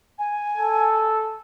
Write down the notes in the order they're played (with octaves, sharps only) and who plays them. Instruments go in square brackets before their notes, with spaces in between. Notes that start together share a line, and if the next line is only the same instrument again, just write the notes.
[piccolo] G#5
[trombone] A4